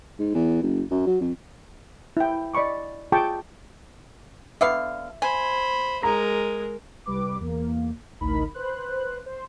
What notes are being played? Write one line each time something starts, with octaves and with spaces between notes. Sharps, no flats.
G#2
E2
F#1
F#2
F#3
F2
E4 G5
D5 D#5 B5 C#6 D6
F4 G#4 G5 A5 C#6 D6
D3 B3 E5 F5
C5 G#5 B5
G#3 A#4 A#5
C2 G3 B4 D6
E2 A#3
A1 D2 D#4 A#4 B5
B4 C5 F#6
C5